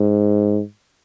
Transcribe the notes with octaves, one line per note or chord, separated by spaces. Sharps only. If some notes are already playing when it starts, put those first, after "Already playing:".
Already playing: G#2